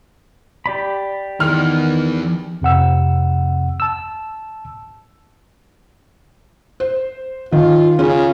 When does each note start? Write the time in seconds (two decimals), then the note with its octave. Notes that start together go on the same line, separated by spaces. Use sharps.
0.66 G4 D5 B5
1.40 E2 D#3 E3 F6
2.62 F2 C3 F#5 E6
3.80 A5 E6
6.80 C5
7.52 D#3 F4
7.99 C#3 C#4 F4